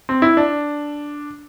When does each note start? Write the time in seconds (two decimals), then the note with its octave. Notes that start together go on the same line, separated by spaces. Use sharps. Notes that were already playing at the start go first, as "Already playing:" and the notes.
0.09 C4
0.22 E4
0.37 D4